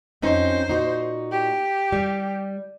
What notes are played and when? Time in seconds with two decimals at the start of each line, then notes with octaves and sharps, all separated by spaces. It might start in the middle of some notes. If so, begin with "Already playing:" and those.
0.22 F2 C#4 D#4 C5
0.68 A#2 D#4 F#4
1.31 G4
1.92 G3